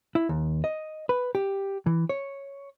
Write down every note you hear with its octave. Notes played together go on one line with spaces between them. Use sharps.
E4
D#2
D#5
B4
G4
E3
C#5